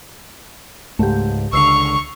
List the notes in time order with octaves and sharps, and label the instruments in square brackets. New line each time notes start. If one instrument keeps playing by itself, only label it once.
[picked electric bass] C#2 G#2 [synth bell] A3 G4
[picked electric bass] C#2 D3 [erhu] C#6 [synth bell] E6 C7 F7